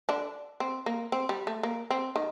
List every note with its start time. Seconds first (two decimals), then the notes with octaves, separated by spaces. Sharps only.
0.09 D3 D4
0.60 C4
0.86 A#3
1.12 C4
1.29 G3
1.47 A3
1.63 A#3
1.90 C4
2.16 D#3